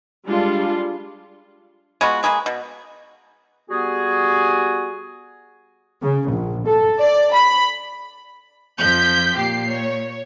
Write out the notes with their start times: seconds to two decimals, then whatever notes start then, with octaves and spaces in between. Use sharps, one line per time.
0.25 G3 G#3 D4 F4
2.01 G#3 B3 F4 F#4
2.23 G#3 A#3 G#4 B4
2.46 B2
3.70 G3 B3 F#4 G#4
6.01 C#3
6.31 A#1
6.68 A4
7.00 D5
7.33 B5
8.79 F2 F3 G6 B6
9.37 A#2 G4 C7
9.70 C#5